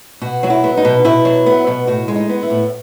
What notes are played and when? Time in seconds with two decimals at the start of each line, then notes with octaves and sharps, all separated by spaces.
0.21 B2 F#4
0.43 F#3 F#4
0.50 E4
0.64 B3
0.77 D#4
0.85 B2
1.05 B2 E4
1.25 F#3
1.46 B3
1.67 B2
1.87 A2 F#4
2.08 G#3
2.15 D#4
2.29 B3
2.43 E4
2.50 A2